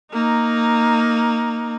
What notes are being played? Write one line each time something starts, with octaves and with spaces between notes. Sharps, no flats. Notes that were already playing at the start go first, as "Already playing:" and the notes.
A#3 D#4